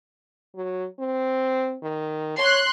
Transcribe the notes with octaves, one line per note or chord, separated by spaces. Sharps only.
F#3
C4
D#3
C#5 C6 F#6